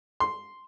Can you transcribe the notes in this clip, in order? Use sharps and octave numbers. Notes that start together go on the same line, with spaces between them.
C6